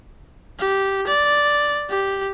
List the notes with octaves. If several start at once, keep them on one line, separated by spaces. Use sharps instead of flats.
G4
D5
G4